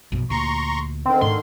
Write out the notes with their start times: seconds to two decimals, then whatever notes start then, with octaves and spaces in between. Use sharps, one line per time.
0.12 A#1 F#2 B2
0.30 D2 A#2 A#5 C6 C#6
1.05 D3 D#3 C4
1.21 G#2 A3 D4 C6